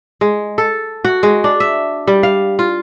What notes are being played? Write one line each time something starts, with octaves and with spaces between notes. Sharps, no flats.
G#3
A4
F#4
G#3
D4
E5
G3
F5
F4